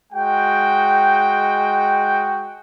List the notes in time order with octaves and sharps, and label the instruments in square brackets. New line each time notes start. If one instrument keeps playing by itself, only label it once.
[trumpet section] G#3 F#4 G5